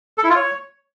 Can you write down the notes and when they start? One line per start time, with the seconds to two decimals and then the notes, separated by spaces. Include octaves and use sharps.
0.18 A4
0.24 E4
0.30 F4
0.36 C#5